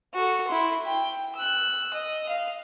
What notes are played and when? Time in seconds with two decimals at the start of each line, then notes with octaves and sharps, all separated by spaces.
0.14 F#4 A4
0.47 E4 C6
0.85 G5
1.35 E6 F#6
1.93 D#5
2.28 F5